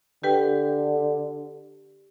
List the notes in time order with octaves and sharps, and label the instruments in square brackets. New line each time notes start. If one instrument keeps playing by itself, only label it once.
[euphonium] D3 [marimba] G4 B4 G5